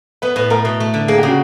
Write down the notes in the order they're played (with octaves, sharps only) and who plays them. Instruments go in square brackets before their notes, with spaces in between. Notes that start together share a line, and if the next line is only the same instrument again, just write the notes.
[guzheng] B3 [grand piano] B4
[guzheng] A2 [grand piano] B4
[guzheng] A3 [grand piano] A#4
[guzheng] B2
A3
D3
[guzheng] A#3 [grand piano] G#4
[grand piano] G4
[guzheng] C#3
[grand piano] F#4